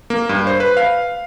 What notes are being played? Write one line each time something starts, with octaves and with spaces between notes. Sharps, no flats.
A#3
G2
C5
B4
F5